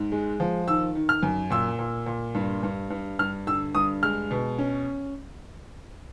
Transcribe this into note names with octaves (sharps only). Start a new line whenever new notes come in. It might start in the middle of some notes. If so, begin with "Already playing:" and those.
Already playing: G#2
G#3
F3
D#3 E6
D#3
F6
F#2
A#2 E6
A#2
A#2
G2
G2
G2
G2 F6
D3 E6
G2 D#6
G#3 F6
B2
C#4